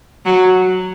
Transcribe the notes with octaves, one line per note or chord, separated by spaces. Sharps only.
F#3